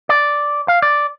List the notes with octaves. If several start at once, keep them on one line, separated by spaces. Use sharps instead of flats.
D5
F5
D5